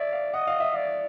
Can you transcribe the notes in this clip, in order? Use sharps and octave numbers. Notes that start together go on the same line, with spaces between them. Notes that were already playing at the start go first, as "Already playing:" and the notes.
Already playing: D5 E5
F5
D#5 F#5
F5
E5
D5 F5